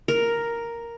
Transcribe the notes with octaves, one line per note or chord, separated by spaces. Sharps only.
A#4